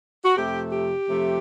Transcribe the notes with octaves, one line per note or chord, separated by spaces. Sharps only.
F#4
F2 C3 F3 A3 G4
G4
F2 C3 F3 A3